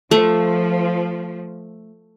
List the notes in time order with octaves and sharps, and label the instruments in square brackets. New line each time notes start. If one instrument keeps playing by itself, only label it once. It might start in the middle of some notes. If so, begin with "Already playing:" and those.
[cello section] F3 [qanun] A3